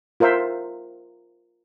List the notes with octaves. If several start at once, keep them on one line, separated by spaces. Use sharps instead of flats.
F4 A#4 C5 E5